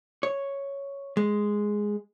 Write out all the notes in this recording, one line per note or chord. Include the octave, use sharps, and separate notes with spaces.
C#5
G#3